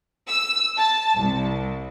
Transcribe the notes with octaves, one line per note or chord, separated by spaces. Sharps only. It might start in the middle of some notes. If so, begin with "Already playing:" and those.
E6
A5
C2